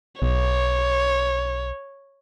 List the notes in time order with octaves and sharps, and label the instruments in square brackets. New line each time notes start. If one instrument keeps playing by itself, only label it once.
[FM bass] B1 [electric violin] C#5